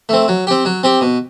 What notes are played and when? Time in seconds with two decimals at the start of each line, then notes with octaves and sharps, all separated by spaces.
0.09 A3 C4
0.28 F#3
0.47 C4 G4
0.65 F#3
0.83 C4 G4
1.01 B2